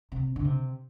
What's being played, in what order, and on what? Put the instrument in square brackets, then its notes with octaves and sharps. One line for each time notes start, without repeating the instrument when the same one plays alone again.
[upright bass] C3
D3
C3